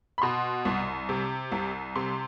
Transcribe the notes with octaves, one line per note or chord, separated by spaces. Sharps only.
B5
B2 C6
C2
C3
C2
C3 C6